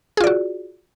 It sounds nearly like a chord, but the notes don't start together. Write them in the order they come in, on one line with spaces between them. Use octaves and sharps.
G#4 F4 D5 F#4